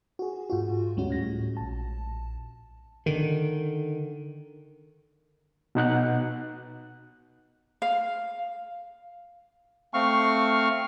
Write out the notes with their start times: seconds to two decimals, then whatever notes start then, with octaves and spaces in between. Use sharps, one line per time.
0.19 F#4 G#4
0.50 G#2 F4 F#4
0.96 D2 G3 G#3 C#4 F#4
1.10 A2 A#6
1.57 A#1 A5
3.06 D3 D#3
5.75 B2 D#4 F#5 F#6
7.82 F5
9.94 A3 C4 F5 C#6 F6